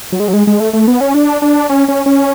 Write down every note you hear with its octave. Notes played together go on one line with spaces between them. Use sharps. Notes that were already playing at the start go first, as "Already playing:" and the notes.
F#3
G#3
F#3
G#3
G#3
A3
A3
B3
C#4
D4
D4
C#4
C#4
C#4